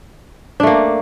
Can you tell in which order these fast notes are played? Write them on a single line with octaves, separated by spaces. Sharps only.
D4 A3 A#3